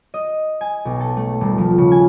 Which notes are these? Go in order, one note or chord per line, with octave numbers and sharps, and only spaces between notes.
D#5
G#5
B1
A4
A3
D#1
F3
C#3
G#5